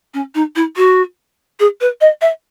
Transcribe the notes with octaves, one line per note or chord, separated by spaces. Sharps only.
C#4
D#4
E4
F#4
G#4
B4
D#5
E5